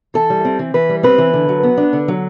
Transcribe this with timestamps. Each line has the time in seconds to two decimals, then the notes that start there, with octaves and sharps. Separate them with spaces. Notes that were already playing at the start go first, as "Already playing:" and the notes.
0.14 E3 A4
0.30 G3
0.45 C4
0.59 E3
0.74 E3 B4
0.89 G3
1.03 C4 B4
1.18 E3
1.34 D3
1.49 F#3
1.63 B3
1.77 D4
1.93 D3
2.08 F#3